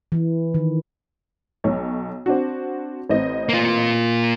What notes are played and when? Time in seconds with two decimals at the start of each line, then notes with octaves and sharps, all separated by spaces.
0.12 E3
0.54 D#3
1.64 B1 C#5
2.26 C4 D4 F#4
3.09 A1 C4 D#5
3.49 A#3 F4